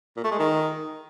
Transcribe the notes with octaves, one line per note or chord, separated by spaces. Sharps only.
A#2
A3
G#3
D#3